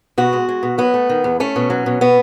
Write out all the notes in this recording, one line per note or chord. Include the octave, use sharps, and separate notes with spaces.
B2 F#4
G#3
G#3
B2
F#3 B3
A3
D#3
E2
A3 C#4
B2
F#3
B2
B2 B3